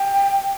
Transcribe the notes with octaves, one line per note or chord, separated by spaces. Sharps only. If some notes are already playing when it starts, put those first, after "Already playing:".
Already playing: G5